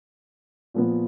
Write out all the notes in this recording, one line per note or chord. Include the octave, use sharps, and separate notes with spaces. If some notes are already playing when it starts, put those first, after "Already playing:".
A#2 F3 B3